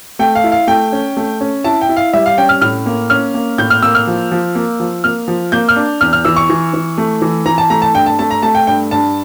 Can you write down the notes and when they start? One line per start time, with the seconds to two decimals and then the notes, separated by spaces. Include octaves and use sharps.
0.19 A3 G5
0.35 F5
0.44 E4
0.52 F5
0.67 A3 G5
0.92 C#4
1.17 A3
1.41 C#4
1.64 E4 A5
1.81 G5
1.89 E4
1.97 F5
2.13 G3 E5
2.26 F5
2.38 C#4 G5
2.49 F6
2.61 A2 F6
2.86 A#3
3.10 C#4 F6
3.34 A#3
3.58 A2 G6
3.70 F6
3.82 A#3 E6
3.95 F6
4.07 F3
4.32 F3
4.55 A#3
4.80 F3
5.04 A#3 F6
5.28 F3
5.52 A#3 G6
5.69 F6
5.76 D4
6.01 E2 F6
6.13 F6
6.25 E3 E6
6.36 C#6
6.50 E3
6.74 E3
6.98 A3
7.22 E3
7.46 E3 A#5
7.58 A5
7.70 A3 A#5
7.82 A5
7.94 G2 G5
8.06 A5
8.19 A3 A5
8.31 A#5
8.43 A3 A5
8.55 G5
8.67 G2 G5
8.91 G2 A5